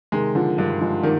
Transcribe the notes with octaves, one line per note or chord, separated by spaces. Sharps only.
C3 D#3 G#3
D3 F3
G2 D#3 G3
F3 G#3
D#3 A#3 D4